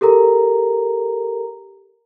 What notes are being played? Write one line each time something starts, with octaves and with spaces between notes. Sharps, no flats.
G4 A4 A#4 A#5